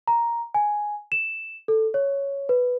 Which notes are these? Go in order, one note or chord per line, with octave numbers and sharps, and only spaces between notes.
A#5
G#5
E7
A4
C#5
B4